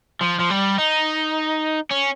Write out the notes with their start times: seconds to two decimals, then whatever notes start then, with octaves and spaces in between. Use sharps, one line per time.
0.22 F3
0.40 F3
0.51 G3
0.78 D#4
1.90 C#4